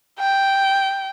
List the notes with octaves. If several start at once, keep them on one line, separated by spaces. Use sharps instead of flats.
G5